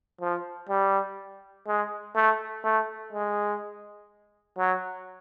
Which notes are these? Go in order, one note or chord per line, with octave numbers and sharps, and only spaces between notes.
F3
G3
G#3
A3
A3
G#3
F#3